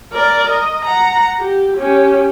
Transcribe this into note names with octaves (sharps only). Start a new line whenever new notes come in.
A#4 D5
D#5
F#5 A#5
G4
C#4 G4